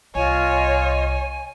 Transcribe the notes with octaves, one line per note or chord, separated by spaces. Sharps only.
C2 F4 C#5 D#5 G#5